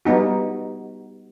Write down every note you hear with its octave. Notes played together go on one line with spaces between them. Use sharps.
G3 B3 D#4 F#4